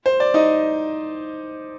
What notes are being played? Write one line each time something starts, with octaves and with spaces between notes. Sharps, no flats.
C5
D5
D#4 D#5